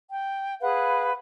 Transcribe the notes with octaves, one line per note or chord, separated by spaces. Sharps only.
G5
G#4 B4 F5 F#5